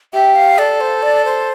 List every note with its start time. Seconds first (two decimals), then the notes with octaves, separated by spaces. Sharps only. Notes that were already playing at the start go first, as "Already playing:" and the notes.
0.13 G4 E5
0.35 F5
0.58 A4 D5
0.81 C5
1.03 D5
1.25 C5